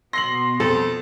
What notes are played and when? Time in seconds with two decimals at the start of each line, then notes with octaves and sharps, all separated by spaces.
0.13 B2 B3 C6 A#6 C7 F#7
0.60 F2 A4